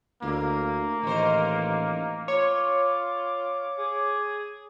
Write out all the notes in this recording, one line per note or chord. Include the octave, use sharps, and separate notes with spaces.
D2 A#3 E4
A1 D#3 C5
F4 C#5 D6
G#4